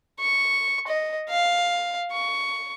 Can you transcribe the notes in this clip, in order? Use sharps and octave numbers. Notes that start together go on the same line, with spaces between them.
C#6
D#5
F5
C#6